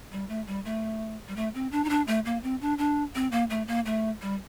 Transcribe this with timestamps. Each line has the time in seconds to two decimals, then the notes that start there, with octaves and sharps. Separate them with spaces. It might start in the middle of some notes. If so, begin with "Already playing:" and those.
0.12 G3
0.29 A3
0.47 G3
0.65 A3
1.28 G3
1.36 A3
1.55 C4
1.72 D4
1.85 D#4
1.89 D4
2.07 A3
2.25 A#3
2.43 C4
2.61 D4
2.78 D4
3.15 C4
3.32 A#3
3.50 A3
3.68 A#3
3.86 A3
4.22 G3